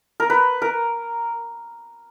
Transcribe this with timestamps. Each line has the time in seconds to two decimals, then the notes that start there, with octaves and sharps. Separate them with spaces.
0.20 A#4
0.30 B4
0.62 A#4